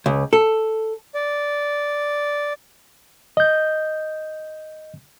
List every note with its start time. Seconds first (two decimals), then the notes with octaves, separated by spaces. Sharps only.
0.06 C#2
0.33 A4
1.15 D5
3.37 D#5 G6